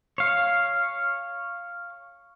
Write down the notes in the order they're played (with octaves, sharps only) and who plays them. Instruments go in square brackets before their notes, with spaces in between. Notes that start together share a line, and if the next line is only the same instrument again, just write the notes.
[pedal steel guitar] C#5 F5